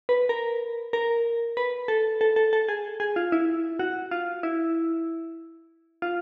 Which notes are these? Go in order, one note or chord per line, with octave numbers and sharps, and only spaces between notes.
B4
A#4
A#4
B4
A4
A4
A4
A4
G#4
G#4
F4
E4
F#4
F4
E4
F4